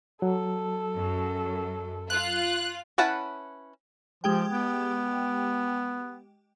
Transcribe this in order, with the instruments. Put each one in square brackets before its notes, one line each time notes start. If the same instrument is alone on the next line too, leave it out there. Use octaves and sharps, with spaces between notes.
[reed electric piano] F#3 [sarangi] A4
[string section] F#2
[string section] F4 [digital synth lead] F#6
[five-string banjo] C#4 E4 B4 F#5 A5
[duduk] F3 [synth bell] G#3 G4 G5
[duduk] B3